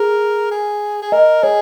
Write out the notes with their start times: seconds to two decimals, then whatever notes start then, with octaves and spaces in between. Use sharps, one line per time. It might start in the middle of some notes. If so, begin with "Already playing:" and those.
Already playing: G#4 A#4
0.51 G#4
1.02 G#4
1.12 A#4 D#5
1.43 G#4 C#5